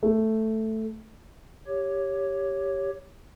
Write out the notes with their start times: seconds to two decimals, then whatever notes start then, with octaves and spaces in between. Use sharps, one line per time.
0.03 A3
1.67 G4 C#5